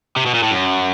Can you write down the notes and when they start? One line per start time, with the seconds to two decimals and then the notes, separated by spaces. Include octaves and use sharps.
0.16 C3
0.26 B2
0.34 A#2
0.43 A2
0.51 F#2